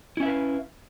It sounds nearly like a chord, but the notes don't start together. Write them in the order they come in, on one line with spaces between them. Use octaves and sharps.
E4 C#4 E5 B4 F5